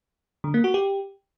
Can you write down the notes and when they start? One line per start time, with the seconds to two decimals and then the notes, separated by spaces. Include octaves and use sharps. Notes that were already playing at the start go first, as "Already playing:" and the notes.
0.44 D3
0.54 A#3
0.64 F#4
0.74 G4